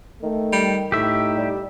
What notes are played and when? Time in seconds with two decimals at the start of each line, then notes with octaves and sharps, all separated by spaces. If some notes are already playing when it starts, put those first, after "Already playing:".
0.23 D#3 A3
0.52 G3
0.92 A2 D#4 G4 E5
1.37 G3